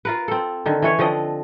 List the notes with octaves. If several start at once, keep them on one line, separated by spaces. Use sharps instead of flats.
F4 A#4 B4
C4 A4
D3 D#3
E3 C#4 C#5
D3 F3 C4 D#5